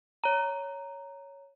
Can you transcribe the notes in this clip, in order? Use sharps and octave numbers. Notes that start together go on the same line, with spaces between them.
C#5 A#5